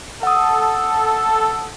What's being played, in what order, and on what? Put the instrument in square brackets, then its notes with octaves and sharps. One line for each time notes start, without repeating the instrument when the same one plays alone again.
[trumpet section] A4 [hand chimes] F#5 D#6